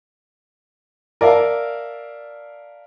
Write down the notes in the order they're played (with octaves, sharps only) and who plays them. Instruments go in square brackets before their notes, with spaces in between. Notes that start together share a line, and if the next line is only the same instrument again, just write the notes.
[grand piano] A#4 D5 E5 F5 A5